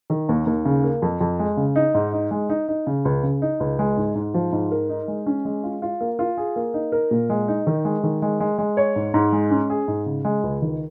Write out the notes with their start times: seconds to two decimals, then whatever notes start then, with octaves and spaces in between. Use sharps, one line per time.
0.10 D#3
0.29 D#2
0.46 D#2
0.65 C#3
0.84 A#3
1.02 F2
1.21 F2
1.39 G#3
1.57 C#3
1.76 D#4
1.94 G#2
2.13 D#4
2.31 G#3
2.49 D#4
2.68 D#4
2.87 C#3
3.05 C#2
3.23 C#3
3.42 D#4
3.60 C#2
3.79 G#3
3.97 G#2
4.15 G#2
4.34 F3
4.52 G#2
4.71 A#4
4.89 D#4
5.08 G#3
5.26 C#4
5.45 G#3
5.63 F4
5.82 F4
6.01 A#3
6.19 F4
6.37 G#4
6.56 A#3
6.74 D#4
6.92 A#4
7.11 A#2
7.30 G#3
7.48 D#4
7.67 D#3
7.85 G#3
8.03 D#3
8.22 G#3
8.40 G#3
8.58 G#3
8.77 C#5
8.96 G#2
9.14 G#2
9.32 G#3
9.51 C#4
9.70 G#4
9.88 G#2
10.06 C#3
10.25 G#3
10.44 C#2
10.62 D#3